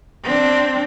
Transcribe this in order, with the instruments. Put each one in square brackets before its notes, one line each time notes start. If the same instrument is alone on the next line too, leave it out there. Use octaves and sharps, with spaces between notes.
[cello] C4 D4